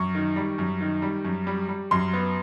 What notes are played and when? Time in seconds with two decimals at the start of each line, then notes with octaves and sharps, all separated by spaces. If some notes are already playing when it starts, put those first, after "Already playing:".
Already playing: F#2 C#6
0.15 D#3
0.36 G3
0.58 F#2
0.81 D#3
1.02 G3
1.25 F#2
1.47 G3
1.68 G3
1.91 F#2 C6
2.13 B3